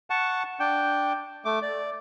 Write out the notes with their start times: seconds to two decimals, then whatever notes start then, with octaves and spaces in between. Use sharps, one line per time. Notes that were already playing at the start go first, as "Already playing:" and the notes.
0.10 F#5 A5 C#6
0.60 D4 G5
1.45 A3 D6
1.62 D5